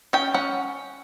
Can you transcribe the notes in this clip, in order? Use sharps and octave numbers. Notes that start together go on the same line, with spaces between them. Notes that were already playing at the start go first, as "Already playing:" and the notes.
C#4 G5
C#4 F#5